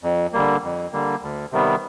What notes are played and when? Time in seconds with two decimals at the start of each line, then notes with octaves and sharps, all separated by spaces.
0.03 F2
0.33 D3 G3 A#3
0.63 F2
0.92 D3 G3 A#3
1.22 D2
1.52 C3 D#3 G3 B3